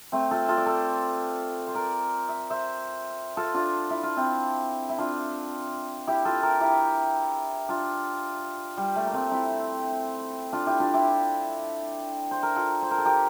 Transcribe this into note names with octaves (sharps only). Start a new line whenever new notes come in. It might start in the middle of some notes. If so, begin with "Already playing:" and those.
A3 C4
F4 A4
F4 A4
D5
A4 C5
C5
A#4 D5
E5
C5 E5
F4 A4
D4 F4
E4
F4
C4 E4
E4
D4 F4
E4 G4
F4 A4
G4 A#4
E4 G4
D4 F4
G3
A3
A#3
A3 C4
C4 E4
D4 F4
E4 G4
D4 F4
E4 G4
C5
A#4
F4 A4
C5
A#4
A4
G4 A#4